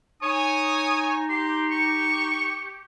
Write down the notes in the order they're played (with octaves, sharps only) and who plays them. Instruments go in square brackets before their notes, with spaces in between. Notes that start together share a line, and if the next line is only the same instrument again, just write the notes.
[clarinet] D#4 [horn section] C#5 G#5 [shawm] D#6
[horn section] G4 [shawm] C6
[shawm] C#6